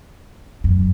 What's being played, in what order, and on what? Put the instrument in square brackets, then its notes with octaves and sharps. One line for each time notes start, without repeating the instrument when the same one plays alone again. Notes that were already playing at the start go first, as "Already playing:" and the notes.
[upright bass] F#2